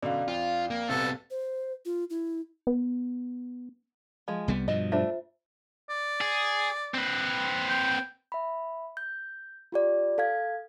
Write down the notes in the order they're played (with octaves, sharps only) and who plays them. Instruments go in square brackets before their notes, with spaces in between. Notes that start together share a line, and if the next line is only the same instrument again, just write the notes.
[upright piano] F#2 B2 D3 [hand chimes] D5 F5
[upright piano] F2 [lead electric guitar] F4
[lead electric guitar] A#3
[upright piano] C2 [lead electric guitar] C3 B3 [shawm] A4
[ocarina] C5
F4
E4
[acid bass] B3
[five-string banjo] F3 G#3
[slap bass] C2 G3 B3
[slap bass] G2 B2 F3 [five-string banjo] D#5
[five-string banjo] A3 D4 [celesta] F4 C5 E5
[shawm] D5
[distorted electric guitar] G#4
C4 B4
[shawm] G5
[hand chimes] E5 B5
G6
F4 G4 D5
A4 F5 G#6